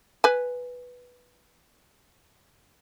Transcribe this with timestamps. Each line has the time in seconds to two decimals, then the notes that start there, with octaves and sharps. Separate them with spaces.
0.24 B4 G#5